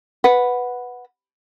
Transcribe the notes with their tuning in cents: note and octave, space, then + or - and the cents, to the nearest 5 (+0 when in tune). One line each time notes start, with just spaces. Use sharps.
B4 +0 F#5 -5